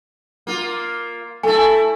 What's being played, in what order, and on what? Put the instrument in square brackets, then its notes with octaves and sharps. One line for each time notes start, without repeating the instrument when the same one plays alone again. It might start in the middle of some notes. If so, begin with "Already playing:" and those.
[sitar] A#3 F4
[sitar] A3 E4 [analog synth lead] A4 [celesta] G#5